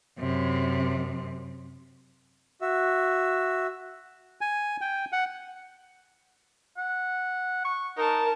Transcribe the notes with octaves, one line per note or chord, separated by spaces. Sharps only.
F#2 C3
F#4 E5
G#5
G5
F#5
F#5
C#6
D#4 A#4 A5